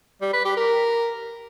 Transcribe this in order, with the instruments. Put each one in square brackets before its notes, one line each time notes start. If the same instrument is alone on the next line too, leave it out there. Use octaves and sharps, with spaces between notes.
[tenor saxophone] G3
B4
G4
A#4